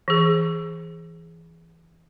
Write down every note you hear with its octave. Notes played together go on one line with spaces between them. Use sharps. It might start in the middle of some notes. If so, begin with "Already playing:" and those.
E3 G#4